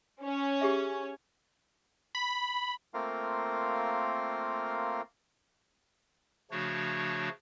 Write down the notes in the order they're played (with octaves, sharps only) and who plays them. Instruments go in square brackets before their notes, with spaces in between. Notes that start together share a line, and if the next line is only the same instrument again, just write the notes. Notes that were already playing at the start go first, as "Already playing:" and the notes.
[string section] C#4 C#5
[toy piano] G4 G#4 E5
[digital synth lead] B5
[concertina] A3 A#3 C4 F4 A#4 F5
[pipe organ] C#3 F3 A3 D4 F#4 C#5